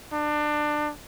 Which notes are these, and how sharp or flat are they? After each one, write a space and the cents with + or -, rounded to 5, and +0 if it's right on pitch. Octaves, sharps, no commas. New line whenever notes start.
D4 +25